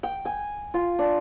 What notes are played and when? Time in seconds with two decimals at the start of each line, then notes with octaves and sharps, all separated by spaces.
0.03 G5
0.25 G#5
0.74 F4
0.99 D4